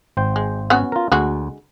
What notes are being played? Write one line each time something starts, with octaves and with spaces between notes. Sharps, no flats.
G#1 C5 G5
G#3
B3 C#4 F#4
F4 A#4
D2 D3 G#3 F#4